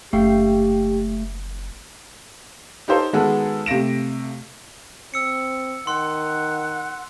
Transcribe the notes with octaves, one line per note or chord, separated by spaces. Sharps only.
F#1 A3 G4 F5 G5
D#4 G4 A4 C5 C#5 F5
D#3 G#3 B3 F#4 G#4 A4
C3 A3 F5 A#6 D7 E7
C4 E6 C#7
D#3 F#5 C6